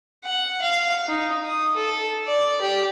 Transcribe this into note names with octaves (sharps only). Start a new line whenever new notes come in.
F#5
F5
D#4
D#6
A4
D5
G4